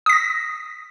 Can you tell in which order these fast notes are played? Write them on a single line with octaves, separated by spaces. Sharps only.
D#6 B6 A#6